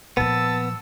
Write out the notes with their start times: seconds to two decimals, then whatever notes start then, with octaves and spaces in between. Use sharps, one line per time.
0.17 A#2 F3 B3 A5 E6